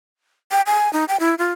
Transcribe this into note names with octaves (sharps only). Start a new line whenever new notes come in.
G5
G#5
D#4
G5
E4
F4